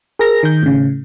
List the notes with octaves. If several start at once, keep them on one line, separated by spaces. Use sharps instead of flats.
G#4 A#4 A#6
D#3 G6
A2 C#3